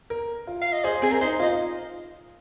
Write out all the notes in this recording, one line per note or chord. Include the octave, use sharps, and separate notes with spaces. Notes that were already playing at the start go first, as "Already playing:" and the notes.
A#4
F4
F5
D#5
G#4 C5
C4 G#4
A#4
D#4 C5
F4 D#5